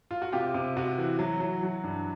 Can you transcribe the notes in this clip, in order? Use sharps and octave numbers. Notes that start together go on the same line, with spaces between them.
F4
F#4
C3 F4 G4
C3
C3 F#4
E3
F#3
F#3
F#3
G2